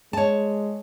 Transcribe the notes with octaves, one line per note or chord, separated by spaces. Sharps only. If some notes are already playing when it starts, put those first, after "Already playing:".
G#3 C#5 A5